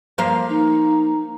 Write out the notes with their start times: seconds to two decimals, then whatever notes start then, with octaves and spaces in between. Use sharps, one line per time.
0.18 F3 A#3 F5
0.49 D#4